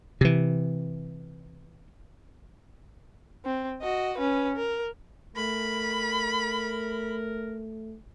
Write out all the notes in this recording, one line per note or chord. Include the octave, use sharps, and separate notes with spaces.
C3 E3
C4
F#4 D#5
C#4 B4
A#4
A3 A#4 B5